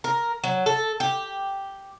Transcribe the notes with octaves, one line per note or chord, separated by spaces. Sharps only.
A#4
F#3
A4
G4